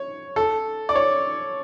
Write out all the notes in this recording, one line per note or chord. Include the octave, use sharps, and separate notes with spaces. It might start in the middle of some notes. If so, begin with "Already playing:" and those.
Already playing: C#5
A4
D5
C#5